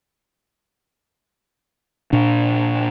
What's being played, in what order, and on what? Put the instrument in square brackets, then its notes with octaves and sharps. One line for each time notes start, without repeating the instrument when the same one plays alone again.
[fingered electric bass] A#2 D4